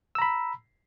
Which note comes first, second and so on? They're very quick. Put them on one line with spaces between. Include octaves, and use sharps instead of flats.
E6 A#5 B5